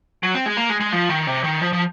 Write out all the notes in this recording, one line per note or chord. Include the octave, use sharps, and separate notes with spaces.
F#3
C4
G#3
A#3
G#3
G#3
F3
D#3
C3
D#3
F3
F3